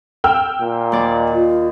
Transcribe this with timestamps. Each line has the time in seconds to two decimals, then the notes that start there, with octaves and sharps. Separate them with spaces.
0.24 G5 E6 F6
0.60 A#2
0.92 D#2 D5
1.32 F4